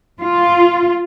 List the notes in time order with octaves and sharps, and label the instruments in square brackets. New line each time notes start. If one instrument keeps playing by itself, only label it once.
[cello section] F4